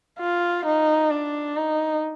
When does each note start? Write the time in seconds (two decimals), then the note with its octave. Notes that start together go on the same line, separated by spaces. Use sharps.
0.19 F4
0.65 D#4
1.10 D4
1.56 D#4